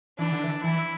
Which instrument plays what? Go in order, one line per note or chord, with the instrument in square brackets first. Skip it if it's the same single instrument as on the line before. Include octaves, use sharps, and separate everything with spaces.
[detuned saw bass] E3 [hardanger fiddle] D4
[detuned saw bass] D3
E3
[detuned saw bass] E3 [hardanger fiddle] E4